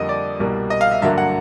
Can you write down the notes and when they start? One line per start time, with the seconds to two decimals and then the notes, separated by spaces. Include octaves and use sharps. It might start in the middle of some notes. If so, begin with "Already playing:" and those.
Already playing: F2 D3 G3 A#3 D#5
0.09 D5
0.39 C2 B2 G3 A#3
0.70 D#5
0.81 F5
0.91 E5
1.02 G2 D3 F#3 A#3 E5
1.18 F#5